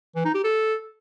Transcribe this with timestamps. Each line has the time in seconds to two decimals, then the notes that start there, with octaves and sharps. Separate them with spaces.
0.15 E3
0.25 D#4
0.35 G4
0.44 A4